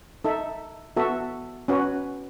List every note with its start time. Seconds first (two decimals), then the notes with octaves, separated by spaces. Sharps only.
0.24 D#4 A4 E5
0.97 B3 F#4 A4 E5
1.68 C#4 F#4 B4